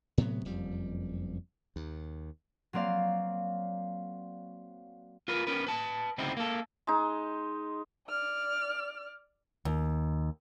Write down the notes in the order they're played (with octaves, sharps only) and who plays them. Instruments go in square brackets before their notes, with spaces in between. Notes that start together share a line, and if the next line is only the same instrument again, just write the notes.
[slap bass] A2 C3 F#3 B3
F#1 F2 G3
D#2
[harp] F#3 A#3 C4 D5 F5
[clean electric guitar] F4 A#4 B4
C#4 A#4 B4
B4 A5
D2 C#3 C4 D#4 E4
A#3 A4
[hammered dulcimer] G#3 D#4
[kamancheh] D5 F6
[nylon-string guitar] D#2